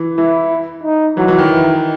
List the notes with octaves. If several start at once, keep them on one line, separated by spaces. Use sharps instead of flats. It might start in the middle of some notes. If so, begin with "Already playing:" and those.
Already playing: E3
E3 E4
D#4
E3 F#3
E3
D#3
E3